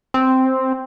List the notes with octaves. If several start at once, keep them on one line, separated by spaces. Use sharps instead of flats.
C4